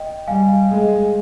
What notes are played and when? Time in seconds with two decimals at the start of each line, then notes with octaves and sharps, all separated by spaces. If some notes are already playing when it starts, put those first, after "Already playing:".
Already playing: D#5 G5
0.28 G3 F5 G#5
0.70 G#3